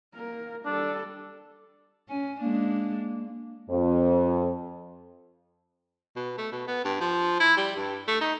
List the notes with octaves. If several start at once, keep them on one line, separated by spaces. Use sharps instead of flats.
A#3 A#4
G3 D4 A4
C#4 G#5
G#3 A#3 D4
F2
B2
A3
B2
B3
G2
F3
E4
G3
G2
A3
D#4